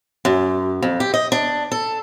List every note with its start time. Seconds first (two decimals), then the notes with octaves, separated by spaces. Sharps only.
0.25 F#2
0.82 F2
1.00 G4
1.14 D#5
1.32 D4
1.72 A4